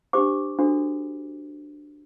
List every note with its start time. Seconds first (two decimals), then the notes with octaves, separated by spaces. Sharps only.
0.13 D4 G4 C5 D6
0.59 D4 F#4 A4 C5